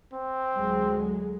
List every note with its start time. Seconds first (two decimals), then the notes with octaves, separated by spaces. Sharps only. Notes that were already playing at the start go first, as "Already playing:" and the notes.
0.14 C4
0.56 D2 F#3 G#3